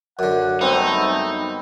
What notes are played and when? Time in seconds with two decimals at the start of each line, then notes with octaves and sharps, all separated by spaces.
0.19 F#2 D3 F#5
0.61 G3 A3 B3 C4 D#4